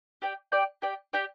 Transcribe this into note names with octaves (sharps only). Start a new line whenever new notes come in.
G4 D5 G5
G4 D5 G5
G4 D5 G5
G4 D5 G5